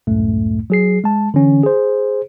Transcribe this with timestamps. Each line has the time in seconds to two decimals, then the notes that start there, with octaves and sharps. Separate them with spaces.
0.07 C#2 F#2 A2 A3
0.70 F#3 G#4 C7
1.04 G#3 A5
1.34 D3 E3 C#4
1.63 G#4 C5